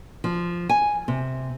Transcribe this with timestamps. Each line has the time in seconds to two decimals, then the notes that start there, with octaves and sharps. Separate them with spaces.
0.24 F3
0.69 G#5
1.08 C3